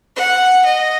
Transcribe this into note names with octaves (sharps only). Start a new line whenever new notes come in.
F#5
D#5